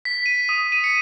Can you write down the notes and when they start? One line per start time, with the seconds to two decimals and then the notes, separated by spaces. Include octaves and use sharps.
0.05 B6
0.26 D#7
0.49 D#6
0.72 D#7
0.84 C#7